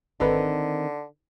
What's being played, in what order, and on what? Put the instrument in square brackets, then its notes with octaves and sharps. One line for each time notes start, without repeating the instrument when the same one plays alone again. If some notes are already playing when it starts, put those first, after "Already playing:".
[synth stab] G#1 A4 B4 [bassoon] D3 [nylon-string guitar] D#3 C4 D#4